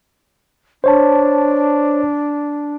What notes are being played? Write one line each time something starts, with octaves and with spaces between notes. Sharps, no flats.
D4 C5 C#5 A5